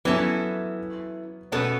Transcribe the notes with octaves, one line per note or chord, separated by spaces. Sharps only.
E3 F#3 B3 C#4 E4 A4
B2 A3 B3 C#4 A4